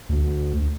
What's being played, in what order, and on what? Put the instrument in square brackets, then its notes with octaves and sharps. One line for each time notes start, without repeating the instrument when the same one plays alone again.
[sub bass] D2